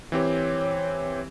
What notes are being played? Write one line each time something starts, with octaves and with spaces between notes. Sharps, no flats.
E3 C4 G4 C#5